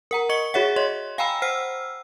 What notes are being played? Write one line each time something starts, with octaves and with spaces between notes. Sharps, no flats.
A#4 F#5 A#5
D#5 C#6 C#7 G7
F#4 G#4 C#5 E5 F#5
C#5 D#5 C6
F5 G5 G#5 A#5 B5 E6
C5 F#5 E6 F6 C7